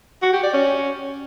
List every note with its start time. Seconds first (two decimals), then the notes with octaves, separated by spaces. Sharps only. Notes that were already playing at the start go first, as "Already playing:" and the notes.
0.22 F#4
0.33 G4
0.43 D5
0.53 C#4